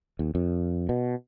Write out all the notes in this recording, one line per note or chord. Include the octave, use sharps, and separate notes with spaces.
D#2
F2
B2